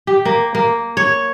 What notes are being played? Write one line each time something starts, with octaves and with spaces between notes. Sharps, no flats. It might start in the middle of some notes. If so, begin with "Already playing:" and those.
G4
A#3
A#3
C#5